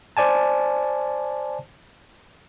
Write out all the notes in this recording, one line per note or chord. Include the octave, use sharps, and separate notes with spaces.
C5 D5 G#5 A5